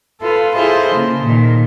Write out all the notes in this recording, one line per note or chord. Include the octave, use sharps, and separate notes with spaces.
F4 A4 B4
E4 F4 G#4 A4 C5 D#5
C#3 A#3
A#2 D#3